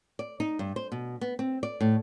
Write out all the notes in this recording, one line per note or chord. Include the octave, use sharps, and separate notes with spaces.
D5
D#4
G2
C5
B2
B3
C4
D5
A2